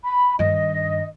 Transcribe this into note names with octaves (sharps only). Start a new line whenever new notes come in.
B5
G2 D#3 D#5